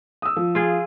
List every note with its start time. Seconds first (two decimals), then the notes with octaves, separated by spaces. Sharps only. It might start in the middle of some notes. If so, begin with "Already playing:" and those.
0.22 D#6 E6
0.36 F3
0.55 F4 G#4